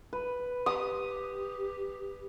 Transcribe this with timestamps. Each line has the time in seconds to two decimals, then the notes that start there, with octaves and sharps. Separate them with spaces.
0.13 B4
0.66 G4 D#6